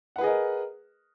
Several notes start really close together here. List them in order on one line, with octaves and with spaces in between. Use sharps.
F#5 B4 G#4 D#5 A#4